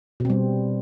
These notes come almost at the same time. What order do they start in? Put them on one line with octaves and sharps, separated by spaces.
B2 C4 G3